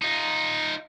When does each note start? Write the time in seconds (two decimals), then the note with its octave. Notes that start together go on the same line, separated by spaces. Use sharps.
0.02 D#4 F4